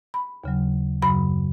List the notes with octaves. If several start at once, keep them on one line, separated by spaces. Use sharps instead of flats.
B5
D#2 C#3 F#3
F#2 C#3 F#3 B5